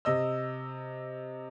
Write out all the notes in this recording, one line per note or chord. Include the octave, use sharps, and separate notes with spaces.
C3 D#5 E6